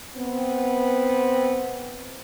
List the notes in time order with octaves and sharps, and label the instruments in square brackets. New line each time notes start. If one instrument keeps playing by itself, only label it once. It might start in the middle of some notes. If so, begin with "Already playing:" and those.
[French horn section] B3 C4